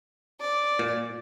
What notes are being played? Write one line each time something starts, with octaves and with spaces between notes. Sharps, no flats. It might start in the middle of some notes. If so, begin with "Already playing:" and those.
D5
A#2